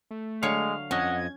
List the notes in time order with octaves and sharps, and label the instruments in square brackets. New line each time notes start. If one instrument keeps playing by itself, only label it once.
[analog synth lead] A3
[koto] D3 F#3 C#5 [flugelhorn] G#3 [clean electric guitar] F5
[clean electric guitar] F2 D#5 [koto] C#4 [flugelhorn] F#5 [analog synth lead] G#6